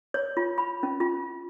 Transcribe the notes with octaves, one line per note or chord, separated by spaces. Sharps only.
C#5
F4
B5
C#4
F4